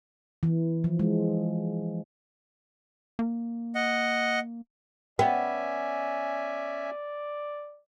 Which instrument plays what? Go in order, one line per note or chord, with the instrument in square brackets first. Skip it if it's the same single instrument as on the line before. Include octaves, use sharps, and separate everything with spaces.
[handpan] E3
F3
G#3
[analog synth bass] A#3
[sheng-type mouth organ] D#5 F#5
[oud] B3 [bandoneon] C#4 E5 G#5 [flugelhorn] D5 [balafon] G5